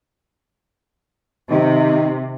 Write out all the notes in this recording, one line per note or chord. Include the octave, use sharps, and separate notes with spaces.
C3 D#3